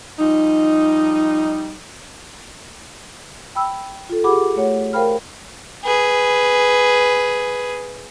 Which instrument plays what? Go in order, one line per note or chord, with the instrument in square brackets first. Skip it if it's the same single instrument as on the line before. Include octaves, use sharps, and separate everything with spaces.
[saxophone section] F3 G3 D#4
[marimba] G5 B5 E6
F4 A4
F4 G4 G#4 F#5 B5 D6
A3 C#5 F#5
A#4 C5 F5 G5 B5 F6
[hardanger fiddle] G#4 B4